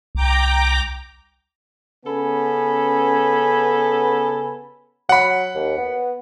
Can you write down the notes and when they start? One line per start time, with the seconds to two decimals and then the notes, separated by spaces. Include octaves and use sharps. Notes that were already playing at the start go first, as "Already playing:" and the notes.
0.15 C2 G5 A#5 D6
2.06 C#3 B3 C#4 A4 G#5 B5
5.09 F#3 F#5 B5
5.55 D#2
5.78 B3